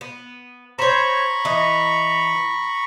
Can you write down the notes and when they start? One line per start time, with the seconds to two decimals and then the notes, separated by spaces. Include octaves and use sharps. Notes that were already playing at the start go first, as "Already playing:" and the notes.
0.01 B3
0.79 C5 C#5 A#5 B5 C#6
1.45 E3 D#5